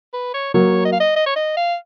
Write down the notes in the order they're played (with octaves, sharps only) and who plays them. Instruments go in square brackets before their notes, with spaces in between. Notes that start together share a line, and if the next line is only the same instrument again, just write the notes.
[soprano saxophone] B4
C#5
[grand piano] F#3 A#3 [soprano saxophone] C#5
[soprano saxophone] D#5
F5
D#5
D#5
C#5
D#5
F5